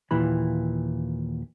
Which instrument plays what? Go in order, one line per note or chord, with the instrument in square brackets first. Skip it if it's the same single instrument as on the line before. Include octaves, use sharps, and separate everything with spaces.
[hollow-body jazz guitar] D#2 A#2 E3 B5